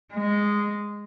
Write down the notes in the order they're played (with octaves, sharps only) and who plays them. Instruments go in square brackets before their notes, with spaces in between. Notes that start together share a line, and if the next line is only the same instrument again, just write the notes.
[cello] G#3